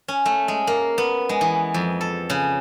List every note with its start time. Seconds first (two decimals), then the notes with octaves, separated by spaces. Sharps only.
0.08 C#4
0.26 A3
0.48 G#3
0.67 A#3
0.98 B3
1.29 G#3
1.41 E3
1.74 F2
2.01 A4
2.30 C#3